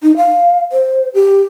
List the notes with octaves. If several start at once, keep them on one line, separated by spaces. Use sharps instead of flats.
D#4
F5
C5
G4